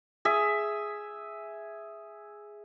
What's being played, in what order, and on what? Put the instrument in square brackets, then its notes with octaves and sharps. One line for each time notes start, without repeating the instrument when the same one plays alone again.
[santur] G#4 E5